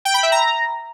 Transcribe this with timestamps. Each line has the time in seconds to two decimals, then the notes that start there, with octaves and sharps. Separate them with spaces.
0.05 G5
0.14 B5
0.23 E5
0.32 A#5